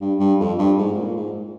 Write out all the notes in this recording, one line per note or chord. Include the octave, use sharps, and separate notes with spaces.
G2
G2
F2
G2
G#2
A#2
G#2